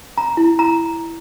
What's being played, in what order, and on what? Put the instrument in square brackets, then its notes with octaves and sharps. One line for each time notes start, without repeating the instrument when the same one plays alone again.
[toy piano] A#5
E4
A#5